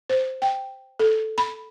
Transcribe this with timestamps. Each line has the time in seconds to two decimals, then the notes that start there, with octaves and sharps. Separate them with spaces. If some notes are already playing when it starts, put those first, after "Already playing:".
0.10 C5
0.42 G5
0.99 A4
1.38 B5